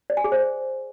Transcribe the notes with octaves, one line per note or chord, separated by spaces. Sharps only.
D5
G#5
G#4
C5